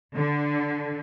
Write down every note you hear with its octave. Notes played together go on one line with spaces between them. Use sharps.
D3